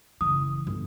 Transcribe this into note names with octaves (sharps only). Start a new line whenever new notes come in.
F#1 E3 D#6
G1